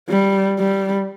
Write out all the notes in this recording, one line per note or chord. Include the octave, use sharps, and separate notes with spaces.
G3
G3